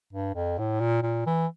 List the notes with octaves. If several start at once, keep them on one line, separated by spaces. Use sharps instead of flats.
G2
F2
A2
A#2
A#2
E3